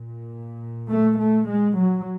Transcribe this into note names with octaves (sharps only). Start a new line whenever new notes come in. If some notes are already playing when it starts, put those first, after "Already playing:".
Already playing: A#2
A3
A3
G#3
F#3